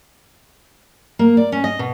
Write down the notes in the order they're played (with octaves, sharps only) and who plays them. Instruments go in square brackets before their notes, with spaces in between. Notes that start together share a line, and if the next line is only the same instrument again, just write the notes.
[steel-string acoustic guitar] A#3
D5
C#4
D#5
B2